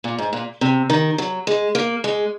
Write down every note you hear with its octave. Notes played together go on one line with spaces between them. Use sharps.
A#2
G#2
A#2
C3
D#3
F#3
G#3
A#3
G#3